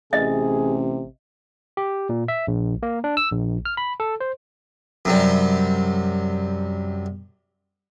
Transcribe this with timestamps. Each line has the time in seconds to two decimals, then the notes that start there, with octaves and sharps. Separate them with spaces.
0.13 A1 C3 G#4 D#5 E5
1.77 G4
2.09 A#2
2.28 E5
2.47 A#1
2.83 A#3
3.04 D4
3.17 E6
3.31 A#1
3.65 F6
3.77 B5
4.00 A4
4.21 C5
5.05 F#2 C3 G3